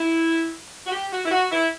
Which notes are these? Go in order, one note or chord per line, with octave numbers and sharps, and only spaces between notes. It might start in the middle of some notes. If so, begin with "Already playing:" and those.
Already playing: E4
F#4
G4
F#4
E4
F#4
E4